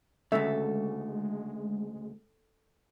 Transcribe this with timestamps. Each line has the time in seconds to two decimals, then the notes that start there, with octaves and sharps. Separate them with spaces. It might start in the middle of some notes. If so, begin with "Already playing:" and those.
0.32 D2 A2 C#3 G#3 A4 E5